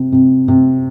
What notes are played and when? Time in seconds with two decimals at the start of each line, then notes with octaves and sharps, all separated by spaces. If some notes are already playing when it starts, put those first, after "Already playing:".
Already playing: C3
0.12 C3
0.48 C3